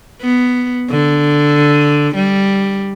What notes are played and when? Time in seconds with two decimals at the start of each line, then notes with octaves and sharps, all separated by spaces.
0.22 B3
0.90 D3
2.15 G3